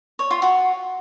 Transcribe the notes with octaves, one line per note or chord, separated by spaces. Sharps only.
C#5
F4
F#4